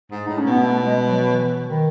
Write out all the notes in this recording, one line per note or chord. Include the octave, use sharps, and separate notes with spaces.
G#2
A2 D#4
C#4
B2 B3
A3
G#3
F#3
E3
D#3